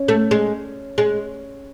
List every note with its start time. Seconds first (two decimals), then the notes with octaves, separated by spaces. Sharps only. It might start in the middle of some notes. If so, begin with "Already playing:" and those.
Already playing: C#4
0.08 A3
0.31 G#3
0.98 G#3